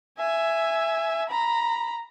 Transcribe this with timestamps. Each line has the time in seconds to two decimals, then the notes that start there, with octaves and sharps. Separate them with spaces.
0.18 E5 G#5
1.29 A#5 B5